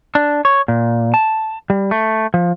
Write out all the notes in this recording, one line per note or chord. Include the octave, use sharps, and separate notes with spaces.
D4
C#5
A#2
A5
G3
A3
F3